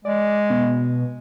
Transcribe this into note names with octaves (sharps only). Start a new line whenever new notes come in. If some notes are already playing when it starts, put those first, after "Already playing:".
G#3 D5
B2